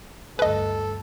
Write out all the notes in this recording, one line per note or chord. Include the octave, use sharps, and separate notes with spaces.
D2 G2 A4 B4 D#5